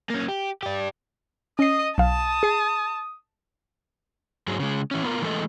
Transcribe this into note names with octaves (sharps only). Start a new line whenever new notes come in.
A#3 C#4
G4
D4 G4
C#4 D#5 D#6 C7
B1 F5 A5 D#6
G#4 C7
G#2 F#3 G#3
C#3 G#3
E3 C#4
B3 F4 A#4
E3 G#3 A3 G#4 A4 D#5